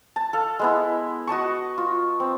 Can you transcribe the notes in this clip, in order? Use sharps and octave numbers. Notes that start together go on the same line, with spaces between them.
A5
A4 F5
G#3 B3 E4
F#4 D#5 A5 C#6
F4
C4